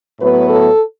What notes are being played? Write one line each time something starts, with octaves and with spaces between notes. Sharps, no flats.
A2 F#3 B3 B4
A4